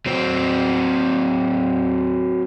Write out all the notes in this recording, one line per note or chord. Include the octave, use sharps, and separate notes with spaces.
F#3 C4 C5